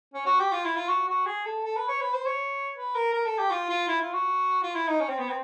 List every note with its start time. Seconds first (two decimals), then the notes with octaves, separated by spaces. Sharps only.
0.14 C#4
0.26 F#4
0.39 G4
0.52 F4
0.64 E4
0.76 F4
0.88 F#4
1.08 F#4
1.26 G#4
1.45 A4
1.64 A4
1.77 B4
1.88 C#5
2.01 B4
2.14 C5
2.26 C#5
2.75 B4
2.95 A#4
3.13 A#4
3.26 A4
3.38 G4
3.51 F4
3.69 F4
3.88 E4
4.01 F4
4.14 F#4
4.63 F4
4.75 E4
4.88 D#4
5.00 C#4
5.09 C4
5.18 B3
5.29 C4